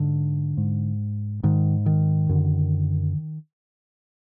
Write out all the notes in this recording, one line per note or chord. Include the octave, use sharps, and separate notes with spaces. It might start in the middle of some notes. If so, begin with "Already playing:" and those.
Already playing: G#2 D3
G#2
G#2 D#3
D#3
F#2 D3